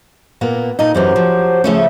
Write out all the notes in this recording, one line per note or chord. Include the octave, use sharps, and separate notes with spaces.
A#2 A#3 B3
A#2 D#4 A4 D#5
F#2 E3 F#3 C#4 G4 C5
F3
C#3 F3 A3 C#4